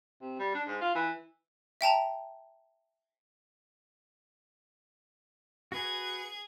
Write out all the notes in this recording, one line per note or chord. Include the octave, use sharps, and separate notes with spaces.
C3
G3
D4
G#2
F4
E3
E5 G5 A5 A#5
F#4 G#4 B4 G#5 G#6